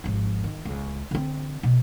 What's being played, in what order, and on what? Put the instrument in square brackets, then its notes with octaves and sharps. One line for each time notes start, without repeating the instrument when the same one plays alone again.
[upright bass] G#1 F3
D#3
C#2
D3 C4
B2